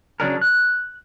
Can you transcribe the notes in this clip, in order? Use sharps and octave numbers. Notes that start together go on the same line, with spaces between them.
C#3 F#3 D4 G#4 A#4
F#6